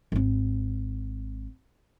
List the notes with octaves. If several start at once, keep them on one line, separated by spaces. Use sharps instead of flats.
G#1 C4